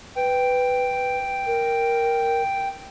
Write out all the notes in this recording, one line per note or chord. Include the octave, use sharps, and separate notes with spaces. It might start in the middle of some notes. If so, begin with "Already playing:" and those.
B4 G5
A#4